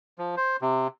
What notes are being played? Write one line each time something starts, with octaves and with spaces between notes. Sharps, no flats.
F3
C5
C3